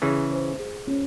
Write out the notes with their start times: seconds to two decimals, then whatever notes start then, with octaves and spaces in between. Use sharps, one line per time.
0.02 C#3 E3 G#4
0.31 C5
0.59 G#4
0.87 C#4